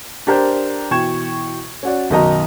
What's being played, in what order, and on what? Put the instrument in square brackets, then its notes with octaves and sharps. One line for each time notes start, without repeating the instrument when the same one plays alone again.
[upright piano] D4 G4 A#4 C5
B2 E3 G5 C#6 G#6 E7
C#4 F#4 D5
B1 F#2 D#3 D#5 A#5